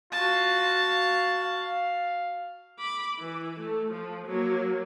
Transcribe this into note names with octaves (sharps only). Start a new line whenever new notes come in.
F4 F#4 A5
F5
F5
B5 D6
E3
A3
F3
F#3 A#3